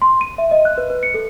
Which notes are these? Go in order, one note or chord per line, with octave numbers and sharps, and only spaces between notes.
C6
D#7
E5
D#5
F#6
B4
B4
C#7
A4